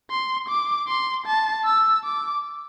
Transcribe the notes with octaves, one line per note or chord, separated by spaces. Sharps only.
C6
D6
C6
A5
E6
D6